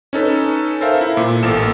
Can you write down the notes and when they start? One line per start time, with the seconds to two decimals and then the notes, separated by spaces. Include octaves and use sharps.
0.13 C#4 D#4 A4 B4
0.81 A4 A#4 C5 E5 F5
1.01 E4
1.17 A#2
1.43 A1 A#3 A4 E7